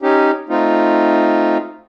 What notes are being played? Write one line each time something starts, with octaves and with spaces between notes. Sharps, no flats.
C#4 D#4 G4
A3 C4 D#4 F4